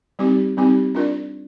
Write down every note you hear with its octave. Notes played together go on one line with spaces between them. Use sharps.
G3 C4 D#4 G4
G3 C4 D#4 G4
D4 F4 A#4 D5